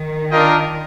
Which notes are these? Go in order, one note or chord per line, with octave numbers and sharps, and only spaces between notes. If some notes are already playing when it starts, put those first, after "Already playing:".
Already playing: D#3
D4 F4 A#4 D#5 G5